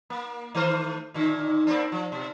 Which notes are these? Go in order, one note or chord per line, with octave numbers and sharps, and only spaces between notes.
A#3
D#3 A3 C5
A#2 D3
A#3 C4 D4
F3
B2